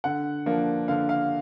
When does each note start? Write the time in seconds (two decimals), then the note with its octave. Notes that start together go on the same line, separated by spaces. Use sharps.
0.04 D3 F#5
0.46 F3 A#3 D4
0.88 D3 F5
1.09 F5